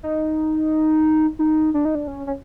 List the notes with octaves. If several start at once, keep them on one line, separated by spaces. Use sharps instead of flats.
D#4
D#4
D4
D#4
D4
C#4
C#4